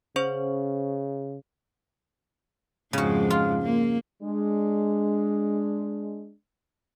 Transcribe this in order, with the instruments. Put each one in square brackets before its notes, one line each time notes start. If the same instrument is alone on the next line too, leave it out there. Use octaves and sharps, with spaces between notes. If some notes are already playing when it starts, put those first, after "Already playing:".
[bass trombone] C#3 [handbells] C#4 C5 C#6
[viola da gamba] F2 G#2 G#3 [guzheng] C#3 F#4
[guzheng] F4
[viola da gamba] A#3
[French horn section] G#3 D4